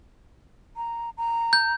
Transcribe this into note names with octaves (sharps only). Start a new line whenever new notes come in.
A#5
A#5
G6